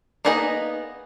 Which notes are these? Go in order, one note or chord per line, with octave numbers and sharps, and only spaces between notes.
A#3 B3 D#4 G#4 D#5